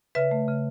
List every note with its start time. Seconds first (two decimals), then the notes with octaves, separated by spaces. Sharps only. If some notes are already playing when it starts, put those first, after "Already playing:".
0.15 C#3 B4 E5
0.31 A3
0.48 C#3